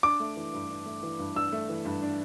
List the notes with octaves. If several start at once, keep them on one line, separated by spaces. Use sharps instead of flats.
D4 D6
A3
E3
G2
D4
A3
E3
G2
D4 E6
A3
E3
G2
D4